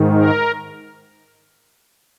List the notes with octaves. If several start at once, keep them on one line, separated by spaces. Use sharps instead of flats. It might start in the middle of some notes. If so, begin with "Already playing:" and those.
Already playing: G#2 D#3
A#4